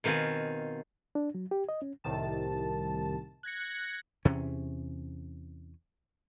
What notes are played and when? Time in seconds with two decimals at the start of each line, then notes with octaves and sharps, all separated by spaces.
0.04 B2 D#3 C4 F4 G#5
1.15 D4
1.35 F#3
1.51 G4
1.69 D#5
1.82 C#4
2.04 C2 A2 C3 D#3 A5
3.43 F#6 G#6 A#6 C#7
4.25 E2 C3 C#4